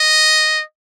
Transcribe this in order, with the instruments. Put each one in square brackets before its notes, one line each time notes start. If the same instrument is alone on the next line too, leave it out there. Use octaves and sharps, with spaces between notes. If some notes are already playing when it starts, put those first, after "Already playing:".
Already playing: [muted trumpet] D#5